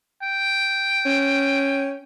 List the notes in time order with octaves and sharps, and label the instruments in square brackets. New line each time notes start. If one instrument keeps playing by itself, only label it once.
[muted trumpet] G5
[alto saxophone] C#4